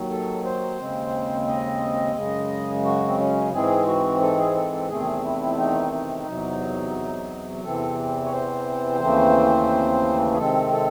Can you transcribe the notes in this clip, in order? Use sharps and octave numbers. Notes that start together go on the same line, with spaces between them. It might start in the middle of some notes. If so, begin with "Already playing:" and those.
Already playing: D#2 D#3 F#3
A4
C5
D#2 C#3 G#3 C4
D#5
F#2 C#3 G#3
F#4
C4
C#4
G#2 E3 G#3 C4 G#4
F#4
A4
G#4
A4
A4
E2 C3 D#3 A3 C4 G#4
E4
D#4
D#4
E2 C3 F#3
E2 C3 E3 C4 A4
C#5
C5
D#2 C#3 E3 A3 C4
G#4
C3 D#3 G#3 C4 A4
A4